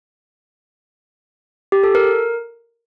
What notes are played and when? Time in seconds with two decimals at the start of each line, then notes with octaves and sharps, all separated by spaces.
1.72 G4
1.83 A4
1.95 A#4